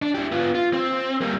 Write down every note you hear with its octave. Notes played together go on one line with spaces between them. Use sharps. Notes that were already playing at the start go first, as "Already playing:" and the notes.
D4
E4 G4
B3 F4
F4
C4
G3 A#3